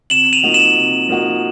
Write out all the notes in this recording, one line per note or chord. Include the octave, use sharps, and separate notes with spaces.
C3 E7 F#7
D#7 F7
F3 A#3 D#4 F#4
E7 F#7
C3
F3 A#3 D#4 F#4